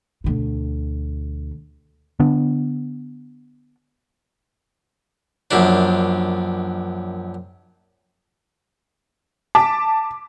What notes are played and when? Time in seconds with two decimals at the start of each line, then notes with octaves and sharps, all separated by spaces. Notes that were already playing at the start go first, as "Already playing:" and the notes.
0.24 D2 B2
2.20 D3 B3 D4
5.51 A#1 F#2 D4
9.55 A5 D6 B6